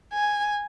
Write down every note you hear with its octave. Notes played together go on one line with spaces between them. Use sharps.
G#5